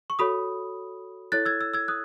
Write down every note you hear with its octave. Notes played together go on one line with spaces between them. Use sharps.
C#6
F#4 A4 C#5 B5 D#6
E4 A4 C#5 F#6 A6
E6 G#6
E6 G#6
E6 G#6
D#6 F#6